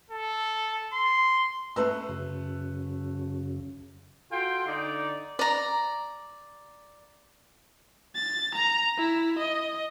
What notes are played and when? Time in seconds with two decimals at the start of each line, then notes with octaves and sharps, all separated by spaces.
0.11 A4
0.94 C6
1.76 A3 B4 E6
2.09 F#2 C#3
4.31 F4 F#4 A4 G5 C6
4.67 D3 D#4 D5
5.39 D5 A#5
8.15 A6
8.55 A#5
8.97 E4
9.39 D#5